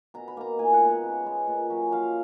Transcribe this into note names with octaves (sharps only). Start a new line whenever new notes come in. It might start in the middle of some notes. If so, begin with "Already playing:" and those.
B2 A#5
B5
A#3 D#4 A#5
A#2 G#5
F#5
G#3 B3
F#5
C#3
G#3 B3
A#2
F#3 C#4
F3 F5